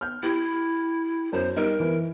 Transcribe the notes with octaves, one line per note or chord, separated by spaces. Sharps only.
F6 G6
E4 G4
F#2 C5
G3 D#4 A#4
E3